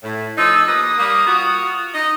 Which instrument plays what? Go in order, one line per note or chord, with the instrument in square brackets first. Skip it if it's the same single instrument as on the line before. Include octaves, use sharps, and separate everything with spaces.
[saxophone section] A2
[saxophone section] F3 D#4 [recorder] E6
[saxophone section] A#3 G4 B4 [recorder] D#6
[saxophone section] G3 A#3
F4 F#4
D#4 D#5